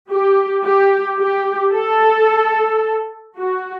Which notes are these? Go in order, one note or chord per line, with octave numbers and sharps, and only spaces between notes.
G4
G4
G4
A4
F#4